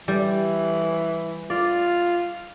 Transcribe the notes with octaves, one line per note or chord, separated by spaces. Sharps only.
E3 G3
F4 D5